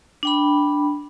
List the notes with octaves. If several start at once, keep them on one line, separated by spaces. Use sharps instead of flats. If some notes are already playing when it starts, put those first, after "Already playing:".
D4 G5 B5